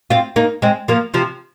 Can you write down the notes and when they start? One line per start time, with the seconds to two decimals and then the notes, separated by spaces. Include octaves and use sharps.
0.10 C4 F4
0.36 A#3 D#4
0.62 G#3 C4
0.88 F3 A#3
1.14 C3 F3